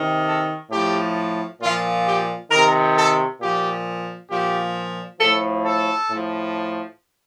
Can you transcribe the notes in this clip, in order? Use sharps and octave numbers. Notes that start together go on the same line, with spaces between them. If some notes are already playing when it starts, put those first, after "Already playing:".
Already playing: C3 D#3
A4
A2 F3 G4
A#2 F3 F4
G4
C3 D#3 A#4
A4
A#2 F3 G4
A#2 F3 G4
A2 F3 A4
A4
A2 F3